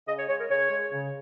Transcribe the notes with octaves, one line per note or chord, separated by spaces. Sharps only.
C#3 D#5
C#5
G#3 C#5
A#4
C#3 C#5
G#3
C#3